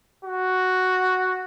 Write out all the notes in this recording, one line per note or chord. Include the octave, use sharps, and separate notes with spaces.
F#4